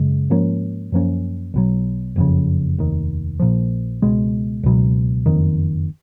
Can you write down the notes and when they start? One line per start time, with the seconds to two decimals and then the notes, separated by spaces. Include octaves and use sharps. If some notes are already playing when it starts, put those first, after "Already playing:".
Already playing: F#2 C#3 G#3
0.30 G#2 F3 A#3 C#4
0.92 F#2 F3 A#3 C#4
1.54 B1 B2 F#3
2.16 F#1 F2 C#3
2.78 F1 D#2 D#3
3.40 A#1 A#2 F3
4.02 C#2 B2 G#3
4.63 C#2 B2 F#3
5.26 F#1 F2 D#3